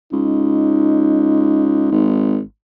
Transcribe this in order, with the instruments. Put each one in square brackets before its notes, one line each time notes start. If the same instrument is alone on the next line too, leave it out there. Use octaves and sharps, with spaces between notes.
[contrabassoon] C#2 [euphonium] D#4
[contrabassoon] G#1